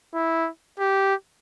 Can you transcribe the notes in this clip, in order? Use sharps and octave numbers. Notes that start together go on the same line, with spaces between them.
E4
G4